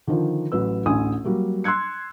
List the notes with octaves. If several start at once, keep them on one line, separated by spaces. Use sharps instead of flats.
D3 D#3 F3
A1 F#3 B4 E6
A1 D2 G#5 D#6
F#3 G3 A#3
C6 E6 F#6 G#6 C#7